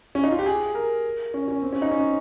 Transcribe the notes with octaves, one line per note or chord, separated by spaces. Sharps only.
C#4
D#4
F4
G4
G#4
A#4
C#4
C#4
C4
C#4
D#4
C#4